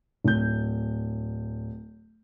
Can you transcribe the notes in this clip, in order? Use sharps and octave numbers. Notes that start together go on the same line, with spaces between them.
D1 G6